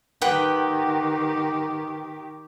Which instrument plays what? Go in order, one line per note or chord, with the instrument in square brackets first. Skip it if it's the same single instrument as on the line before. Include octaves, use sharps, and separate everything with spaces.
[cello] D#3 G4 [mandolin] B4 F#5 G5